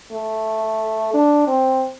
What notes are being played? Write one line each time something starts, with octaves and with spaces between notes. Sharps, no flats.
A3
D4
C4